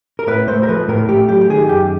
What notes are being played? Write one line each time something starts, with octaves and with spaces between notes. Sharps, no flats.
A#4
A2 B4
A3 C5
A#4
F3 B4
A2 A#4
A3 G4
F#3 G4
G4
D#3 G#4
F#2 G4